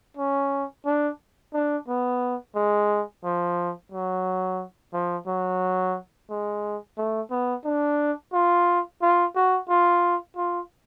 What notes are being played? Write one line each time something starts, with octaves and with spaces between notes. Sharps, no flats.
C#4
D4
D4
B3
G#3
F3
F#3
F3
F#3
G#3
A3
B3
D4
F4
F4
F#4
F4
F4